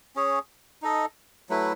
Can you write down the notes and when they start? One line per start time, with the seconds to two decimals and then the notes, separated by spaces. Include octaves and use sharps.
0.16 C#4 G#4 C#5
0.82 D#4 A4 D#5
1.49 F#3 A3 E4 B4